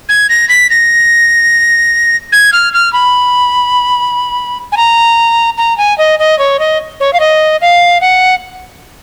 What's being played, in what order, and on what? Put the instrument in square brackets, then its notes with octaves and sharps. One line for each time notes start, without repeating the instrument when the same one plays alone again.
[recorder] G#6
A#6
B6
A#6
G#6
F6
F6
B5
G#5
A#5
A#5
G#5
D#5
D#5
C#5
D#5
C#5
F5
D#5
F5
F#5